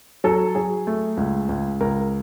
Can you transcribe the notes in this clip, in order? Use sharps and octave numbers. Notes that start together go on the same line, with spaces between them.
F#3 A4
F#3 G#4
A3
C#2
C#2
C#2 A#4